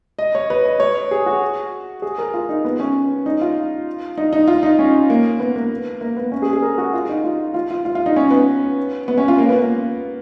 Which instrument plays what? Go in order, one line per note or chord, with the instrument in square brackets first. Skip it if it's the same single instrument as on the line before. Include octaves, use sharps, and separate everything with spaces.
[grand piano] D#5
C#5
B4
D#5
C#5
G#4
F#4
G#4
A#4
F4
D#4
B3
C#4
D#4
F4
D#4
D#4
F4
D#4
C#4
A#3
B3
A#3
A#3
B3
C#4
G#4
G#4
A#4
F#4
F4
D#4
F4
F4
F4
F4
F4
D#4
C#4
B3
B3
C#4
F4
A#3
B3
A#3